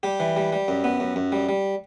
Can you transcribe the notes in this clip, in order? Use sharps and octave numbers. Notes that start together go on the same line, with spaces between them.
G3 G4
E3
G3
G3
F#2
B3
F#2
F#2
G3
G3